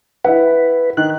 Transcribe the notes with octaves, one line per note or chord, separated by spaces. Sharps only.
E4 B4 F#5
D#3 F#6